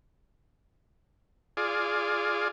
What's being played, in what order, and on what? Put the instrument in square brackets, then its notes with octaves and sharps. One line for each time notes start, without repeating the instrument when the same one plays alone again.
[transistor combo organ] F4 G#4 D5